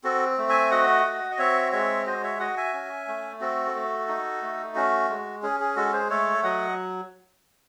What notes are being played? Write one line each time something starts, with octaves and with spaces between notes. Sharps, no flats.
C4 F#4 A4
A3
E5 G#5
F#4 D#5 F#5
F#4
D#5
C4 C#5 E5
G#3 C#5 E5
F#4 C5 D#5
C#5 E5
F#4 D#5 F#5
E5 G#5
C#4
A3
C4 F#4 A4
A3
D#4
A3
C#4 F#4
G#3
C#4 G#4
G#4
G#3 F#4 A4
G#4 C5
A3 A4 C#5
F#3 D#5 F#5